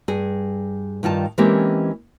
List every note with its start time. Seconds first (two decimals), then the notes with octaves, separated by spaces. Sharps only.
0.08 G2 G#4
1.03 G2 D#3 F4 A5
1.38 E3 G#3 A#3 C4 C#4 G4